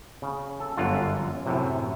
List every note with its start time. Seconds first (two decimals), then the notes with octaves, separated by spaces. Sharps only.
0.22 C#3
0.60 A4
0.77 G1 F#2 D3 F#3 F4 F#5
1.46 F#2 A2 C3